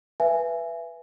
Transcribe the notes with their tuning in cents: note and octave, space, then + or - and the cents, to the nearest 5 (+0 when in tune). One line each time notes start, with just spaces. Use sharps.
B4 +0 E5 +25 G#5 +0